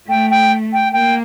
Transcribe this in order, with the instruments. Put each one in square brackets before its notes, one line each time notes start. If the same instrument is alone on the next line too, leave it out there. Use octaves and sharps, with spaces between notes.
[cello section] A3 [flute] G5
[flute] G5
G5
[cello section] A#3 [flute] G5